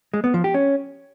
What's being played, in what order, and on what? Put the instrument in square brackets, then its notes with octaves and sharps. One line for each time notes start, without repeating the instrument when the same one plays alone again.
[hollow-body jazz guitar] G#3
B3
F3
G4
C#4